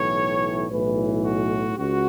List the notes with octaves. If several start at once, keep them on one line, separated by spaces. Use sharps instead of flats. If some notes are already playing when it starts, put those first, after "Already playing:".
Already playing: B1 A2 E3 C#5
B1 A2 E3 B4
F#4
C#2 F#4